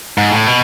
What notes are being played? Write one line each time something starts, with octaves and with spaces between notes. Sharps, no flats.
G#2
A2
B2